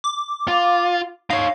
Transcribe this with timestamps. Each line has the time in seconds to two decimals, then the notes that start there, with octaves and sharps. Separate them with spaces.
0.04 D6
0.48 F4
1.30 D#4 C#5 F5